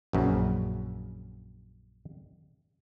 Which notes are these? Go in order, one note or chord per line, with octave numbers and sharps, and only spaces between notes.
A#1 F#2 C#3